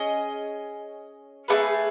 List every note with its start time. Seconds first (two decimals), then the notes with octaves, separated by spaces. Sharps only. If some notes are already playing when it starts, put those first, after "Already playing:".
Already playing: C#4 G#4 D#5
1.48 A3 D#4 G#4 B4